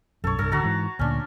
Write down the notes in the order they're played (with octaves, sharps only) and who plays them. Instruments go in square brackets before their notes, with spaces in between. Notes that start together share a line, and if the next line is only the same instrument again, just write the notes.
[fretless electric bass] B1 F#2 [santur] A4 C#5
[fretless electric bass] C2 G2 [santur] A4
[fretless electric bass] D1 D3 [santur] F#4 A5 A#5
[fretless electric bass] G#2 E3
[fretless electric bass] D2 A#2 [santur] C#4 D4